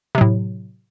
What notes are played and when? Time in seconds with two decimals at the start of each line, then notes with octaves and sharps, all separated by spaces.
0.15 C3
0.18 F#3
0.21 A2